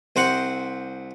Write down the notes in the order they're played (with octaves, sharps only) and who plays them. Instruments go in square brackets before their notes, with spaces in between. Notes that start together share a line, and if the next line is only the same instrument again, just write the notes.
[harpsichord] C2 C4 C5 F#5